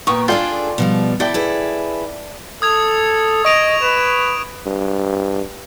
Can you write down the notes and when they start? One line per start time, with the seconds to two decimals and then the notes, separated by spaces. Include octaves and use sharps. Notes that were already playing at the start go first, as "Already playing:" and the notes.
0.07 A#2 A#3 B3 G5 C#6 D#6
0.28 D4 F4 G#4 A4 D5 G5
0.78 B2 F3 G3
1.20 E4 A4 D5 G5
1.34 E4 G#4 B4
2.62 A4 D#6 G#6 F7
3.45 D#5 C#6 D7 F7
3.82 B4 E7
4.66 G2